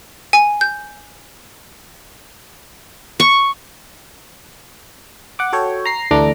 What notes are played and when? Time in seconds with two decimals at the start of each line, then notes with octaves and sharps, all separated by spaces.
0.33 G#5
0.61 G6
3.20 C#6
5.39 F#5 D6
5.53 F#4 A4 C#5 G5
5.86 A#5 C7
6.11 D2 E3 A3 D4 A#5 D6